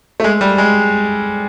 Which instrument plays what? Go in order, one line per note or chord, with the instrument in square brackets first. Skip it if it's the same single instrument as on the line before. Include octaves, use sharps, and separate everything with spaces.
[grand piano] A3
G#3
G3
G#3